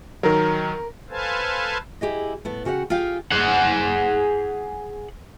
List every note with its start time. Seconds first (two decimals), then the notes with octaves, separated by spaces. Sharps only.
0.23 D#3 F#3 A#4
1.10 A4 B4 C5 F5 G#5 A5
2.01 E4 G4 G#4 D#5
2.45 A2 B3 A5
2.65 C#3 F#4 G4 D5 F#5
2.90 F4 G4 G#4 F5 G5
3.31 G#4 F#5